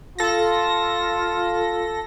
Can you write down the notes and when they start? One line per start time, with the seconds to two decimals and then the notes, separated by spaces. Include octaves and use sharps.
0.19 F4 A4 A#6